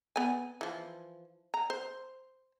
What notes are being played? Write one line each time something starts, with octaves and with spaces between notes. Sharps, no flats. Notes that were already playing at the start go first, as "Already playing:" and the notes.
B3 G#5
E3 F3
A#5
C5